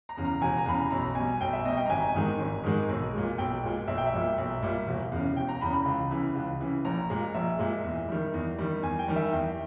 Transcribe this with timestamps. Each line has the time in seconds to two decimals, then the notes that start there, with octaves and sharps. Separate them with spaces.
0.09 A#5
0.17 E2 C#3
0.25 A#5
0.41 E1 G#5
0.57 A#5
0.66 E2 C#3 B5
0.75 A#5
0.90 B1 A#5
1.15 B2 G3 G#5
1.41 B1 G5
1.53 E5
1.65 B2 G3 D#5
1.77 G5
1.86 A#5
1.90 G#1 G#5
2.15 G#2 D#3 G#3
2.39 G#1
2.64 G#2 D#3 G#3
2.89 B1
3.14 A#2 G#3
3.38 B1 G5
3.64 A#2 G#3
3.87 B1 E5
3.98 G5
4.07 E5
4.13 A#2 G3
4.38 B1
4.63 A#2 G3
4.87 E1
5.12 E2 C#3
5.36 E1 G5
5.49 A#5
5.61 E2 C#3 B5
5.73 B5
5.85 C#2
6.11 C#3 E3
6.35 C#2
6.60 C#3 E3
6.85 A#1 A#5
7.10 A#2 G#3
7.34 A#1 E5
7.59 A#2 G#3
7.84 E2
8.09 D#3 G3
8.34 E2
8.58 D#3 G3
8.82 E2 G#5
8.99 G5
9.08 D#3 G3
9.16 E5
9.33 E2 G5